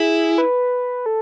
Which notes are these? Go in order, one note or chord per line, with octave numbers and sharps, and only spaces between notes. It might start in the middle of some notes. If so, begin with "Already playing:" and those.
Already playing: E4 G#4
B4
A4